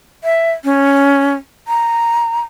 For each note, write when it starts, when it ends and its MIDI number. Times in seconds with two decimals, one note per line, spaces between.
0.24 0.51 76
0.64 1.34 61
1.68 2.41 82